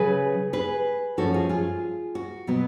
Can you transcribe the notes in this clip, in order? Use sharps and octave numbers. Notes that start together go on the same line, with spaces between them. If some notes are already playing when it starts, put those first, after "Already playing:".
Already playing: C#3 F#3 C#4 G#4 B4
G#4 B4
F#2 F3 A3 C#4 F#4 A4
F4 G#4
F4 G#4
F#4
B2 F#3 B3